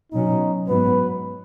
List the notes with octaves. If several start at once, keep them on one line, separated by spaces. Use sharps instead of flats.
B2 F#3 C#4 D#4
G#2 F#3 B3 B4